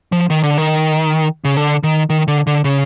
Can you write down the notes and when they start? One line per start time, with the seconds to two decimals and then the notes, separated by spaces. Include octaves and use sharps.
0.12 F3
0.30 D#3
0.43 D3
0.58 D#3
1.45 C#3
1.57 D3
1.83 D#3
2.10 D#3
2.28 D3
2.47 D3
2.64 C#3